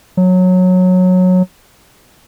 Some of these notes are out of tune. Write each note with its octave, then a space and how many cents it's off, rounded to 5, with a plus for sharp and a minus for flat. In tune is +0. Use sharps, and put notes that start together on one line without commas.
F#3 -15